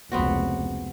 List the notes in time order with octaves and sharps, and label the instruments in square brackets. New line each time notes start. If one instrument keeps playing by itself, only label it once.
[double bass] F1 C#2 [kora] B3 C4 F#4